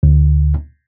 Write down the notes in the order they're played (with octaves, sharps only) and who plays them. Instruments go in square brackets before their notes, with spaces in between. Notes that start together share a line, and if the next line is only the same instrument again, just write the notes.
[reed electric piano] D2